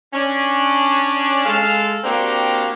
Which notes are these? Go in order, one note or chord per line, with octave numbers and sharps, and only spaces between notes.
C#4 D4
G#3 A4 F5
A#3 C4 D4 F#4 G4 A#5